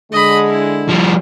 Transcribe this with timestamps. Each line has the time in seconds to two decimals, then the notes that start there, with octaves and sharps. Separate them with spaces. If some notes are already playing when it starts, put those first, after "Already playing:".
0.12 D3 G#3 D#5 B5
0.48 E4
0.89 F3 G3